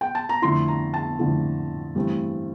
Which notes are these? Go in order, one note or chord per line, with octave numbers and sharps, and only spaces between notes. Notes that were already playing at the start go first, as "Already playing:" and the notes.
G5
A5
A#5
F2 D3 A3 E4 C6
A#5
A5
F2 D3 A3 E4
G2 E3 A3 C4